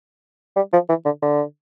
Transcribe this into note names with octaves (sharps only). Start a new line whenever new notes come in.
G3
F3
E3
D3
D3